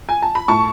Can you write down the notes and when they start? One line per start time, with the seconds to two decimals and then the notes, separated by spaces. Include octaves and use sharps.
0.09 G#5
0.22 A5
0.35 B5
0.48 A2 A5 C#6